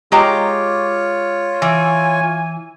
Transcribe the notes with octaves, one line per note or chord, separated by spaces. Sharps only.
G#3 F4 G4 C#5 A#5
E3 G#5